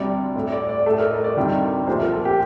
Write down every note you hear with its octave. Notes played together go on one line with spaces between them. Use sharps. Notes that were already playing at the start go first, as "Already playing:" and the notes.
Already playing: D2 C3 G3 D5
A2 A3
D5
D5
A2 A3 A4
A#4
D#5
D5
D2 C3 D#3 G3
C2 A#2 F3 A3 C5
A#4
A4
G4